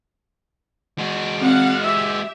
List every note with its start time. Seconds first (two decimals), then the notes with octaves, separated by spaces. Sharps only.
0.98 G#3 F#4
1.41 C4 F5 F#5
1.83 G4 E5 E6